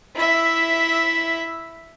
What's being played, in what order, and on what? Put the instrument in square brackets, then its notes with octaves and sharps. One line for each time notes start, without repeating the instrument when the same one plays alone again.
[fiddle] E4 E5